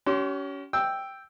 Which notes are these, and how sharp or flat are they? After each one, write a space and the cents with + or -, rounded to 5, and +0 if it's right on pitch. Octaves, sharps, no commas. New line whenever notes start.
C#4 +25 G4 -45 C6 +0
G5 +0 E6 +0